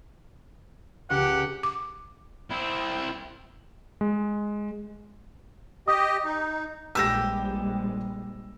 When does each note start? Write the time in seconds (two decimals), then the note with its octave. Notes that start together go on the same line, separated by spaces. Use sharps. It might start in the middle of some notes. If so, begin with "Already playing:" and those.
1.10 C#2 G4 F#5
1.63 D6
2.51 C4 E4
4.01 G#3
5.88 G4 D#5 D#6
6.25 D#4
6.95 A#1 G3 G#3 G4 B4 E6 A#6